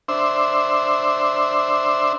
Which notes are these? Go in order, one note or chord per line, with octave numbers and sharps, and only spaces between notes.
D4 C5 E5